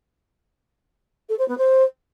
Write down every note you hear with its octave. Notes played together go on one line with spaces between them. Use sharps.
A4
C5
B3
C5